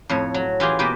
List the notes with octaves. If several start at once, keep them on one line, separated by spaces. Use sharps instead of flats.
F2 A2 C#5
F#3
E3 F4 G4 G#4
B2 A#3 G4 B4